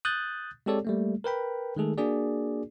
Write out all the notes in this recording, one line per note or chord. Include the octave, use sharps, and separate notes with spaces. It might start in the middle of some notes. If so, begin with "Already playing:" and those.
D#6 F#6 G6 A6
G#3 C4 G4 A4 C#5 D5
G3 A3 A#3
A#4 B4 G5 B5
D#3 G#3 A3 G#4 A4
A#3 D4 F#4 G#4 D5